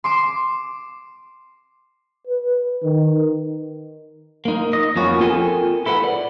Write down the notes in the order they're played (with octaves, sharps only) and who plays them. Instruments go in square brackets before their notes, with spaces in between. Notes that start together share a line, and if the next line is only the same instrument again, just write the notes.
[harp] C6 D6 D7 E7
[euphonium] B4
D#3
[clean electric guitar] A#3 D#4
D#5
F2 F3 A#3 B3 C#4 F#4
C4 F4 A4 A#4 G5 G#5
E4 A4 B4 F#5
D5